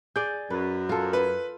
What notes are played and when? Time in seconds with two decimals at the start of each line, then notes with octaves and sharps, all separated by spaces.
0.16 G#4 D5 G6
0.50 F#2 B4
0.89 F4 A4
1.13 B4